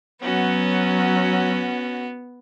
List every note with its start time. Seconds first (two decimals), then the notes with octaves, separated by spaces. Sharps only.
0.22 F#3 B3 C#4 F#4